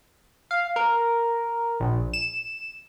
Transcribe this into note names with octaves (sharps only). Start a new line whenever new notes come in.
F5
A#4
A#1
E7